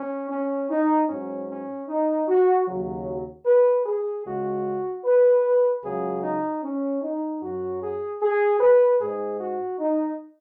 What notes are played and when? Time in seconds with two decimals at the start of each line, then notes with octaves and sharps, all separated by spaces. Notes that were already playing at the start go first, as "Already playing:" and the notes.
Already playing: C#4
0.30 C#4
0.70 D#4
1.09 G#2 F#3 C#4
1.49 C#4
1.88 D#4
2.28 F#4
2.68 D#2 C#3 F#3
3.46 B4
3.86 G#4
4.25 C#2 C#3 G#3 F#4
5.05 B4
5.83 C#2 C#3 F#3 G#4
6.23 D#4
6.64 C#4
7.02 D#4
7.42 F#2 F#3 F#4
7.82 G#4
8.22 G#4
8.60 B4
9.01 G#2 G#3 G#4
9.40 F#4
9.80 D#4